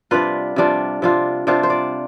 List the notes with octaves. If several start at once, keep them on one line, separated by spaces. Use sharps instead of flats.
C3 G3 D4 F4 B4
C3 G3 D4 F4
C3 G3 D4 F4
C3 G3 D4 F4 C5
C5
D5